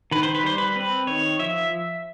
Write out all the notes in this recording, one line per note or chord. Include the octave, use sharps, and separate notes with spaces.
D#3 B4
C5
B4
G3 C5
B4
C4 B4
D#3 C#5
F3 E5